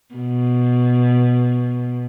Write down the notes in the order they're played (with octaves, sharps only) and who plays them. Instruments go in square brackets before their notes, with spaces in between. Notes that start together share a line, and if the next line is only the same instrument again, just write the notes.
[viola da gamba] B2